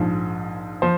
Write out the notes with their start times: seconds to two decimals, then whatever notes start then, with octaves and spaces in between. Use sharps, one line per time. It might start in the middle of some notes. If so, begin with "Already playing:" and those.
Already playing: A#1 G#2 F3
0.82 F3 C5